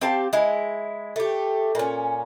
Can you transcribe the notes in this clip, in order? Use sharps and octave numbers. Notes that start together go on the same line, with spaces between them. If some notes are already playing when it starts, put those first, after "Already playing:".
C4 G4 F5 A5
G#3 E4
A3 G4
A#2 C#4